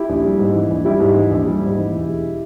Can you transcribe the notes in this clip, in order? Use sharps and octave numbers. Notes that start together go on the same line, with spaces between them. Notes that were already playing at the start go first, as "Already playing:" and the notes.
Already playing: E4 G4
A#1
G3
G#2
E3
A#1
G3 E4 G4
G#2
E3
A#1
G3
G#2
E3
E1
G#3